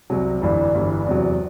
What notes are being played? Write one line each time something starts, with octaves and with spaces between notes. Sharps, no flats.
C2 C3 F#3
G1 G2 E3 G3
G1 G2 E3 G3
E2 C3 F#3